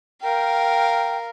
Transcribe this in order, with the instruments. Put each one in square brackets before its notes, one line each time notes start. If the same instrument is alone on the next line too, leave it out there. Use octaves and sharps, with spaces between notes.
[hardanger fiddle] A#4 F5 [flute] G5